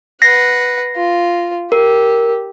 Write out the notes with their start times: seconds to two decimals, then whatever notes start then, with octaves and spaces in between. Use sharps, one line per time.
0.22 B4 F#5 A#6 C7
0.96 F4
1.72 G4 A#4